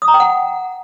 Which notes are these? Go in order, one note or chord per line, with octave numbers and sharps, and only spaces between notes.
D#6
A#5
G5
F#5